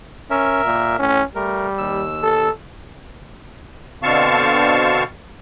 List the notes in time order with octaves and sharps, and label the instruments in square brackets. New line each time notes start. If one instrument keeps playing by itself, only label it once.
[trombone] C#4 [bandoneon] A#4 E5
[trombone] A#2
[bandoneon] A2 [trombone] C#4
[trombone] G3 [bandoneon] A3 A#4
[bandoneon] D#2 E6
[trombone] A4
[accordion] B2 D3 C4 F5 A5 C#6